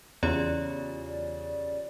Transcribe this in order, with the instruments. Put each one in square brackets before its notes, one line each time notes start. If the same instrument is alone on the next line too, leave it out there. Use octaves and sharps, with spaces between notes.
[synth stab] E2 [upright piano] C#3 [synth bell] F4 G4 C#5 [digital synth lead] D5